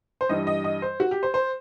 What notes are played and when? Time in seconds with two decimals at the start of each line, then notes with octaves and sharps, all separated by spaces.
0.21 C5
0.29 G2 E3 G3 D#5
0.47 D#5
0.64 D#5
0.82 C5
1.00 F#4
1.11 G4
1.23 C5
1.34 C5